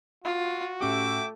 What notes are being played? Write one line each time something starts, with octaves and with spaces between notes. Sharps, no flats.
F4 F#4
A2 A3 C#4 G4 E5 G5 D6